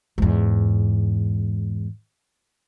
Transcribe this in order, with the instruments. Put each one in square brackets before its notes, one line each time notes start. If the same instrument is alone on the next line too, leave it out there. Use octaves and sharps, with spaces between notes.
[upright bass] E2 G#2